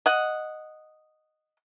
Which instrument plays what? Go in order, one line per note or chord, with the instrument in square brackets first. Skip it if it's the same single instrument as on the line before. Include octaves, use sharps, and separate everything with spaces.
[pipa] D#5 F#5